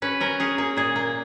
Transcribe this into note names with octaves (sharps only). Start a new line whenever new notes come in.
C#4 B4
C#4 A#4
C#4 G#4
A#3 G#4
A#2 G#4
A#3